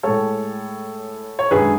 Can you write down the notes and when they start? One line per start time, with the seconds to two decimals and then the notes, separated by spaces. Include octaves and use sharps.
0.03 A2 G#3 A4 C#5
1.39 C#5
1.51 F#2 D3 G#3 G#4 B4